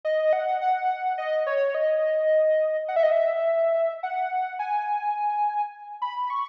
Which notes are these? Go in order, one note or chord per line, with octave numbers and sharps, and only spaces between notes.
D#5
F#5
F#5
D#5
C#5
D#5
F#5
E5
D#5
E5
F#5
G#5
B5
C#6